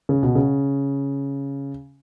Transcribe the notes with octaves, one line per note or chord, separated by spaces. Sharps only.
C#3
B2
C#3